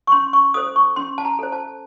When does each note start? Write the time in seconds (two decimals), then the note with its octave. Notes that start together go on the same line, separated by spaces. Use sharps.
0.07 C#6
0.12 C#4 C6
0.33 C#6
0.54 A4 C5 D#6
0.76 C#6
0.96 C#4 C6
1.18 A5
1.25 A#5
1.39 A4 C5
1.52 A5